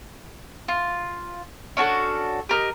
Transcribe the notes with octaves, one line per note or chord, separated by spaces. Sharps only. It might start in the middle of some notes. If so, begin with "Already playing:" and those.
F4
C#4 D4 F#4 A4
G4 A#4 D#5